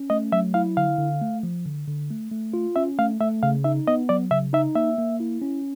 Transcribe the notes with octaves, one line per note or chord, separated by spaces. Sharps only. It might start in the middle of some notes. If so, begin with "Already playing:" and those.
Already playing: C#4
A3 D#5
F#3 E5
E4 F5
D3 F5
D3
A3
F3
D3
D3
A3
A3
F4
C#4 E5
A3 F5
A3 E5
C#3 F5
D#4 E5
B3 D#5
F#3 D5
C#3 E5
D#4 E5
A#3 E5
A#3
E4
C#4